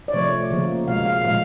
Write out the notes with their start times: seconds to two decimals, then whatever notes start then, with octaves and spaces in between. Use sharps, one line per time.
0.08 D5
0.14 C3 F3 A3 C#5
0.51 C#3 F3 A#3
0.88 B2 G#3 F5
1.06 F5
1.24 A#2 F3 G#3 F5